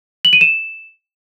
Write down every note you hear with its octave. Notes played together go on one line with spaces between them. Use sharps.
F#7
D#7
E7